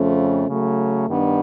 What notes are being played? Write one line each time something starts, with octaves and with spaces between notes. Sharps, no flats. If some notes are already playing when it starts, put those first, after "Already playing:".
Already playing: F2 C#3 F3 A3 C#4
C#3 F#3 A3
G2 D#3 G3 B3 D4